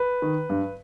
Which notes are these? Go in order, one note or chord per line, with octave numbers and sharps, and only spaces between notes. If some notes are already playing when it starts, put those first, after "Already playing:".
Already playing: B4
D#3
G2